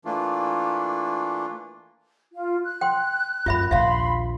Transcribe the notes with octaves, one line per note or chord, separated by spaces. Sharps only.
E3 A3 A#3 D4 F4
F4
F#6
G5 C6
F#2 F4 E5 B5
A#1 D#2 E5 F5 B5 C6